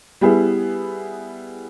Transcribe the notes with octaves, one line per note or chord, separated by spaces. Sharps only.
G3 B3 E4 G#4